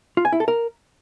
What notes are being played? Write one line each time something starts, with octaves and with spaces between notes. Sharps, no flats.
F4
G#5
E4
A4
A#4